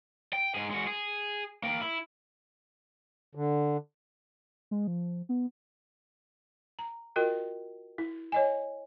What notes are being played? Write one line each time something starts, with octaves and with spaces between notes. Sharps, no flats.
G5
G#2 G#4
G#3 F#4
G#4
A#3 G5
E4
D3
G#3
F3
B3
A#5
F4 F#4 A#4 D#5 G5
E4
C#5 D#5 G#5